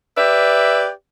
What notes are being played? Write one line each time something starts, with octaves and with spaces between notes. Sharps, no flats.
G4 B4 D5 E5